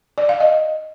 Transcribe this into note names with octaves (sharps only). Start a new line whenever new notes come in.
D5
F5
D#5